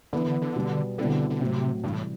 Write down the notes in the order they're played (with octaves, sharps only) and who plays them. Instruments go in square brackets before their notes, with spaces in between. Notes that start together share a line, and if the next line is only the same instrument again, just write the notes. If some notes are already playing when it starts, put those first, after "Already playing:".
[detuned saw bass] D3 [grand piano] E3 B3 E4
[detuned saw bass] D3
D3
[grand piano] B2 G3 B3
[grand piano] B2 G3 C4 E4 [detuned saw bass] D3
[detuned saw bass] D3
[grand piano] A2 F#3 C4 [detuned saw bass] C3
[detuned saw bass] G2 [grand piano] C3 E3 G3
[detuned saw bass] A2